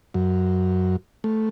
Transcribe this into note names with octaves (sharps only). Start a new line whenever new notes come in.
F#2
A3